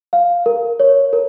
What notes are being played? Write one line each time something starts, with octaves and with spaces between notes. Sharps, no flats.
F5
A#4
C#5
A#4